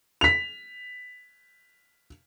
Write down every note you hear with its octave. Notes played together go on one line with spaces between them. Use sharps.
B6 F7